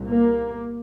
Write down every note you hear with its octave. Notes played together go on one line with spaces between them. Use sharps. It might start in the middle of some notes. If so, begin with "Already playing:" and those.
Already playing: C2 A#2
A#3